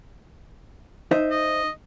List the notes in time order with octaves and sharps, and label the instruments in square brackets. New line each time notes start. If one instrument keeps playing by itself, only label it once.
[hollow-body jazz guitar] D#4 C5 E5
[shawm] D#5